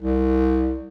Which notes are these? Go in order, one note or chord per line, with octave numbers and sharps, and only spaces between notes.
C2